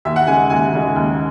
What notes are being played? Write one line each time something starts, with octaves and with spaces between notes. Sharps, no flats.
D#2 E5
F#5
C#3 G#3 G#5
D#2 G#5
C#3 G#3
D#2